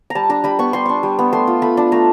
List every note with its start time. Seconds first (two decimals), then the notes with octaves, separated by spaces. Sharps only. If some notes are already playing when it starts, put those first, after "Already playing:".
0.10 A#5
0.15 G3 A5
0.29 D4 A#5
0.44 G3 B5
0.59 B3 C#6
0.73 G3 C6
0.86 D4 C#6
1.03 G3
1.19 B3
1.33 A3 C6
1.47 F4
1.62 A3 B5
1.77 D4
1.92 A3 A#5